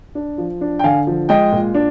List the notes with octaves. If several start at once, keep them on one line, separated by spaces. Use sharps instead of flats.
D4
F3
D4
G5
D3 F5 G#5
F3
G#3 D#5 G5
A#2
D4